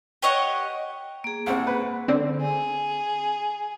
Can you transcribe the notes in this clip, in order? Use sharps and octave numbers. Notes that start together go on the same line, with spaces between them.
G4 C#5 D#5 F#5
A#3 G#4
C2 C4 F#5
B4
D3 C4
G#4